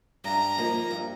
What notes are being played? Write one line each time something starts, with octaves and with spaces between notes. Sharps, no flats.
G2 A#5
F3 A#3 D#4
G2